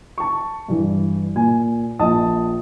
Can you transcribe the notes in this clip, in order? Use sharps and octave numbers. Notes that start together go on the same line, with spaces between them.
A5 C#6
G2 E3
A#2 G#5
A#1 D#5 A5 D#6